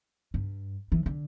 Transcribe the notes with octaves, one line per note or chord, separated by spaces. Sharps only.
G2
E3
D3